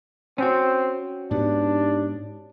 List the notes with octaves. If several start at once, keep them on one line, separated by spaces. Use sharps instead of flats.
C4 C#4 F#4
G#2 B3 D4 D#4 G4